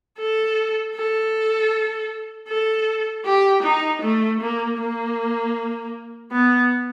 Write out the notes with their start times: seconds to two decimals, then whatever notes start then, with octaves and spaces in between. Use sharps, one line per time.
0.18 A4
0.96 A4
2.48 A4
3.25 G4
3.63 D#4
4.02 A3
4.41 A#3
4.79 A#3
6.32 B3